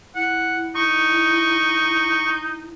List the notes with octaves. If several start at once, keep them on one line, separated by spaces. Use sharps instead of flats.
E4 F#5
D#4 C#6